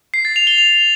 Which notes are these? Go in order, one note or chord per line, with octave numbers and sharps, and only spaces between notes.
C7
A6
F7
G7
F7